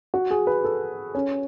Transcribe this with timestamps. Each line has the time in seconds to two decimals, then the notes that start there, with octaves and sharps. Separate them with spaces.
0.14 F#4
0.31 G#4
0.47 B4
0.64 A4
1.15 C#4